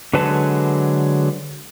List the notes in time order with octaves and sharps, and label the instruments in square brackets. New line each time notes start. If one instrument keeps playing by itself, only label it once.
[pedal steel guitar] D3 F#3 G#3 B4 A5